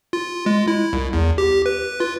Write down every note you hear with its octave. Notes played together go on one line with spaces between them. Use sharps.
F4
G#3
E4
C2
E2
G4
B4
F4